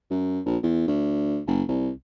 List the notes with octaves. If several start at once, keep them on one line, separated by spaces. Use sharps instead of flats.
F#2
A#1
E2
D2
F#1
C2